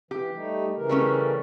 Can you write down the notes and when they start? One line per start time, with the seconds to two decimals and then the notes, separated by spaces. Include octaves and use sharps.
0.11 E3 G4
0.34 G3 A3 D#4
0.76 C#3 E3 A#4
0.89 G3 A3 C#4